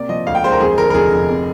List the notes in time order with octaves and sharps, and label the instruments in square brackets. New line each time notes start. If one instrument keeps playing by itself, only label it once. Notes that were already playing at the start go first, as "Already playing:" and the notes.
Already playing: [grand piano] C3 A#3 D5
F3 D#5
D2 F5
G5
G#3 C5
A#4
F2 G#4
D3 A#4
A#4
F1 G#4
F1
C3